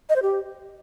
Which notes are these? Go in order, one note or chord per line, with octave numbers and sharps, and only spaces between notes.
D#5
C5
G4